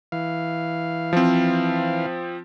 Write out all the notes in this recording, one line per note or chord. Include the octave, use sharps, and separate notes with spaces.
E3 F5
F3 C4